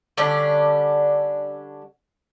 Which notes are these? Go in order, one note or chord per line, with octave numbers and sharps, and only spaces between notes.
D3 G3 C#4 D4